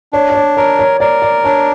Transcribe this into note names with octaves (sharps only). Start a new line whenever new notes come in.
D4 C#5
C#5
D5
A#4 C#5
C#5
A#4 D5
D5
D4 C#5